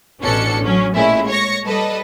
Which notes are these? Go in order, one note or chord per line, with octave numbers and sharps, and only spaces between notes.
A1 B2 C#4 D4 A4 C#7
F#3 C#4
A#2 G#3 A3 C#4 E4
C#5 C#6 A#6 C#7
G3 A4 B4 D#5